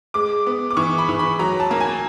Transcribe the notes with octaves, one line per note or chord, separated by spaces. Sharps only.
G#3 D6
B3
D6
E3 C#6
B5
E3
B5
F#3 A#5
A5
A#3
G#5